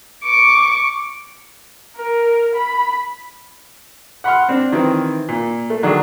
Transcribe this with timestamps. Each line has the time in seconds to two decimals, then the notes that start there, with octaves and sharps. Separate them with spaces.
0.24 C#6 D6
1.97 A#4
2.55 B5
4.24 F#5 B5 C6 F6
4.49 C4 D4
4.72 D#3 E3 C4
5.29 A#2
5.70 A3
5.83 D3 D#3 F#3 D4 G#4